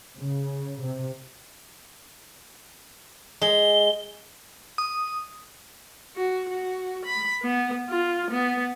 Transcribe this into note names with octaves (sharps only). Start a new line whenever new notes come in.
C#3
C3
G#3 G7
D#6
F#4
F#4
B5
B3
F4
B3